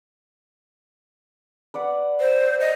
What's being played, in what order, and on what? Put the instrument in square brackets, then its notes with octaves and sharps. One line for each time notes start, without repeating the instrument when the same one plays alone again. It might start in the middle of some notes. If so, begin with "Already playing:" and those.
[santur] B4 D5 F#5
[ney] C5
D#5